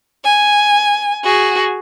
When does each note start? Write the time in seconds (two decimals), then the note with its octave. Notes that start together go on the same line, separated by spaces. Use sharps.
0.24 G#5
1.24 F#4 G#4